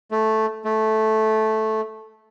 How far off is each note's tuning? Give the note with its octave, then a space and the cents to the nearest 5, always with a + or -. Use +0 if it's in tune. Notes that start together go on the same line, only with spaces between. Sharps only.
A3 -5
A3 -10